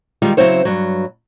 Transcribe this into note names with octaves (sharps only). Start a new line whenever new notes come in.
D#3 G3 G#3 F4
C#3 F#3 C4 E4 C5 C#5
G2 F#3